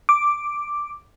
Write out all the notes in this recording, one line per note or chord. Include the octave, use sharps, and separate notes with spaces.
D6